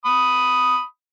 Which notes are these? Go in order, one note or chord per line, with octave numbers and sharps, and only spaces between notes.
B5 D#6